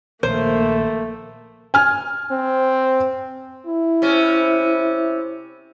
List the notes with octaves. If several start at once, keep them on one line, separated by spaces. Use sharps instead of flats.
A#1 D#3 A3 A#3 C5
G#5 F6
C4
E4
C3 C#4